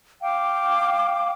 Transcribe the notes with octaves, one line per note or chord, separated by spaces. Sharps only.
F5 G5 D6